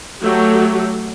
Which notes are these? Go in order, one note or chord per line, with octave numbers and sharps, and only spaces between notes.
F#3 A3 G4